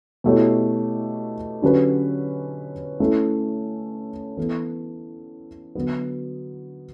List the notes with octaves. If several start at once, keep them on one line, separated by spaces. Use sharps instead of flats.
B2 A3 E4 G4 C#5
D3 F#3 C#4 G4 B4
A3 C#4 E4
E3 B3 E4 A4
D3 F#3 B3 F#4